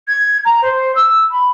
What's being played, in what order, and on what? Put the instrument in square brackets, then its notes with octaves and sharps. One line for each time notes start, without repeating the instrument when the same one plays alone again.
[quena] G#6
A#5
C5
E6
B5